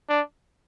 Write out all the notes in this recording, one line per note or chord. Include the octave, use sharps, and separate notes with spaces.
D4